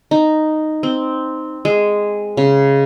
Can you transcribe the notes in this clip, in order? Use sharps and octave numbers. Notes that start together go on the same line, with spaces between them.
D#4
C4
G#3
C#3